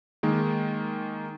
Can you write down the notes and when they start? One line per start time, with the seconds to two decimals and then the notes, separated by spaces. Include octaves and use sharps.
0.23 D#3 G#3 A#3